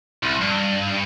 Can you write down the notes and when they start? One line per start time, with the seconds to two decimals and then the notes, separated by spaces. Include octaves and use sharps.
0.23 C2
0.41 G2